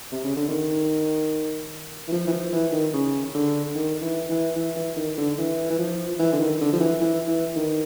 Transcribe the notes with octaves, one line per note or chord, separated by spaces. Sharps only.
C3
C#3
D3
D#3
E3
F3
E3
F3
E3
D#3
C#3
D3
D#3
E3
E3
E3
E3
D#3
D3
E3
E3
F3
E3
D3
D#3
D3
F3
E3
E3
E3
D#3